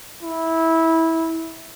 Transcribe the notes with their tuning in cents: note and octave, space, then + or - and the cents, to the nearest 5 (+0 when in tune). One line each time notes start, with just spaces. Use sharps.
E4 -15